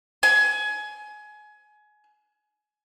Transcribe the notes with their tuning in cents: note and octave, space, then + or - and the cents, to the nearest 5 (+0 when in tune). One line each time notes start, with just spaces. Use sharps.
G#5 +25